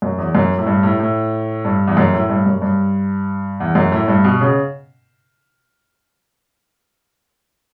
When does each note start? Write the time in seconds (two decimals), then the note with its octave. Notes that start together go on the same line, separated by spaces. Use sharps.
0.02 F#2
0.18 E2
0.35 F#2
0.58 A2
0.66 G2
0.83 A2
1.00 A2
1.65 G2
1.87 E2
1.97 F#2
2.14 A2
2.29 G2
2.46 F#2
2.62 G2
3.60 E2
3.75 F#2
3.92 A2
4.08 G2
4.24 B2
4.41 C#3